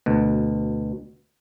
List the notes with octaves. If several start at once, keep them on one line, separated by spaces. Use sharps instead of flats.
D2 B2